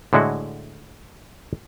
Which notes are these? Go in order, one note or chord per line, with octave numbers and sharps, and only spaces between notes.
A2 D3 G#3 E4 F#4